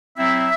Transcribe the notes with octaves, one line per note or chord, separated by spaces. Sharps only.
F#3 C4 E4 E5